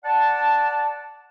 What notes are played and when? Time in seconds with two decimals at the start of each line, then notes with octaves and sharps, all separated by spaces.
0.04 D5 F#5 A5